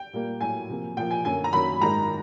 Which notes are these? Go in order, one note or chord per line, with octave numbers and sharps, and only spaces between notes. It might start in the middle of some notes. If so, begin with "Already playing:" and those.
Already playing: G5
A#2 G3 A#3
A2 F#3 A#3 G#5
C3 F3 A#3
A#2 F3 A#3 G5
G#5
F#2 D3 F#3 A#3 G#5
A#5
F#2 D#3 F#3 A#3 B5
G#2 D#3 G#3 A#5